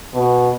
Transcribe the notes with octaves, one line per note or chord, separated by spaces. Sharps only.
B2